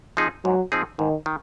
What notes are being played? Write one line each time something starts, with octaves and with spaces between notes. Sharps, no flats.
F3 C4 D#4 G#4
G#2 F#3
F3 C4 D#4 G#4
G#2 D#3
D#3